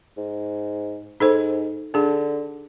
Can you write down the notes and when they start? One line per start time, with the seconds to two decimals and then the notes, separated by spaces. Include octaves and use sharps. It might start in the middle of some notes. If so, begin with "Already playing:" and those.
0.17 G#2
1.20 G#2 D#4 A4 C5
1.94 D3 D4 G#4